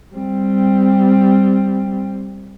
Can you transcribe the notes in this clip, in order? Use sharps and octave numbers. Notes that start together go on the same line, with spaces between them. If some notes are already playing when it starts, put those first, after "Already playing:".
G3 C4